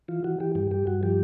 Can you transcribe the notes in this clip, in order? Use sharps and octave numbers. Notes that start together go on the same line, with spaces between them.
E3 F4
E3 F#4
E3 G4
G2 G4
G2 G4
G2 F#4
F3 G4